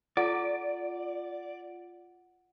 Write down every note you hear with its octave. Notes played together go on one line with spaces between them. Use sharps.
F4 D5 F#5